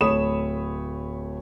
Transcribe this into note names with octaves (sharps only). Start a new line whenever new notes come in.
D1 A3 C#5 B5 D#6 E7